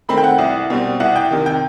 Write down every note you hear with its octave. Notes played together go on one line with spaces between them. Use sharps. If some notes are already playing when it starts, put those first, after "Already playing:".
D#3 A3 C4 B5
G5
F#5
C2
B2 G3 C4
C2 F#5
G5
C3 D#3
G5